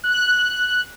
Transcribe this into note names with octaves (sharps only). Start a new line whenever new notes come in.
F#6